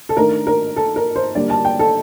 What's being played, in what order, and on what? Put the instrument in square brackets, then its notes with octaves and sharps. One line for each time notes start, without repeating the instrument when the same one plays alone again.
[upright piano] A4
D#3 A3 D4 A#4
A#4
A4
A#4
C5
D3 G3 A#3 D4 D5
A5
G5
A4